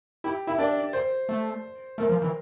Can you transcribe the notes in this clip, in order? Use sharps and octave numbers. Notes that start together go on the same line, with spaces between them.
E4 G4
E4 E5
D4 D5
C5
A3
A3 A#4
F3
E3